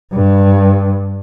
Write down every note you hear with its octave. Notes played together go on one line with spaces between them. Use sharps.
G2